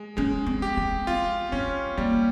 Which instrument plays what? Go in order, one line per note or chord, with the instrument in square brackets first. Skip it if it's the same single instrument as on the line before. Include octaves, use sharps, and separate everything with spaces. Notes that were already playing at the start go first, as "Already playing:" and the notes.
Already playing: [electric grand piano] G#3
[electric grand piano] G#3 [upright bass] C#4
[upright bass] C4
[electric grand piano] G4
[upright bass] C4
[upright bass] C4 [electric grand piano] F4
[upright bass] C4 [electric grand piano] C#4
[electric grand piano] G3 [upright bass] A#3